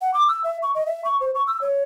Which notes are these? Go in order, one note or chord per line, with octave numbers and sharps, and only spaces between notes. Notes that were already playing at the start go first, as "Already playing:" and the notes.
F#5
D6
E6
E5
C#6
D#5
E5
C#6
C5
C#6
E6
C#5